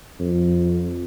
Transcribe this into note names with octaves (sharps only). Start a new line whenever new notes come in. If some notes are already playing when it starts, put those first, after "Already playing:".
F2